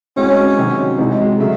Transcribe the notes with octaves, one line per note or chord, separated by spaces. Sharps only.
A2 G#3 C4 C#4 F#4
C3 D#3 F#3 C4 F#4
C3 E3 G#3 D#4 F#4
G#3
C#3 F#3 A3